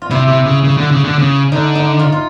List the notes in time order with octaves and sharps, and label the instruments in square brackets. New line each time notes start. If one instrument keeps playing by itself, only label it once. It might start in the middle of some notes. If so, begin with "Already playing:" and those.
[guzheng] F4
[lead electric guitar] C3 [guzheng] E4
[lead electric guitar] C3
C#3
C#3
D3
C#3
D3
C#3
[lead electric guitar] D3 [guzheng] D#4
[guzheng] D#4
F4
F4